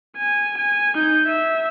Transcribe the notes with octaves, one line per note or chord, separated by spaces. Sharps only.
G#5
G#5
D#4 G6
E5